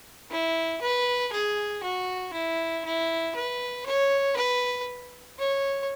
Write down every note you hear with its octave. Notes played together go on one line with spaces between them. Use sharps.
E4
B4
G#4
F#4
E4
E4
B4
C#5
B4
C#5